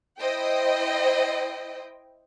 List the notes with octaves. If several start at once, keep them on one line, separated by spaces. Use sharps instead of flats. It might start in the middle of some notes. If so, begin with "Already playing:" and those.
E4 C5 D#5 G5